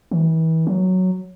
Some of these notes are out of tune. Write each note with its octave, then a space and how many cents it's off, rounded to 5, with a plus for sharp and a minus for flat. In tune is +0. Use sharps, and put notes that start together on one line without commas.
E3 -35
F#3 +0